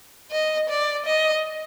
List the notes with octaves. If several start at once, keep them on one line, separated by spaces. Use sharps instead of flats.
D#5
D5
D#5